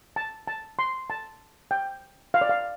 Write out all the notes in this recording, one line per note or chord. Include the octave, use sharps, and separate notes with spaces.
A5
A5
C6
A5
G5
F5
D5
F5